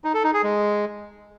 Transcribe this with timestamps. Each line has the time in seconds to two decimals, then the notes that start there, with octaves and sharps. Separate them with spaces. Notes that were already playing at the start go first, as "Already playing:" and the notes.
0.04 D#4
0.14 A4
0.24 D#4
0.34 G#4
0.43 G#3